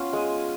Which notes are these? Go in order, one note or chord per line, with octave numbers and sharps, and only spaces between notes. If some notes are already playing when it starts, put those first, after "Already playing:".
Already playing: B3 C#4 F4 F#5
G#3 G#5